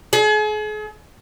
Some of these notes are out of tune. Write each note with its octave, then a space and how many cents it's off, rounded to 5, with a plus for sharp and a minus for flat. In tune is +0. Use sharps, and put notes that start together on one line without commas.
G#4 +40